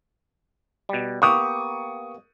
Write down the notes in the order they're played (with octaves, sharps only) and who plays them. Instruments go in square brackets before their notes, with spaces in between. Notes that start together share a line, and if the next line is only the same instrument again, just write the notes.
[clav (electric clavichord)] B2 G3
[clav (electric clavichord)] A#3 B3 G4 [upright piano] C#6 D#6